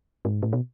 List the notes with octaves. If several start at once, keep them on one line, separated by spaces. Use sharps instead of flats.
G#2
A2
B2